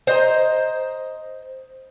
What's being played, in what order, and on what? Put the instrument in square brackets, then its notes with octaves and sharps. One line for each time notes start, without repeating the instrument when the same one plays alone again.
[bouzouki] C5 D#5 A#5